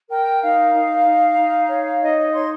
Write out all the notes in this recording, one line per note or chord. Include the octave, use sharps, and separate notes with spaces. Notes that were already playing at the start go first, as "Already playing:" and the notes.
A#4 G5
D#4 F5
D#4
D#4
D#4
C#5
D#4 D#5
D#5
C#5 C6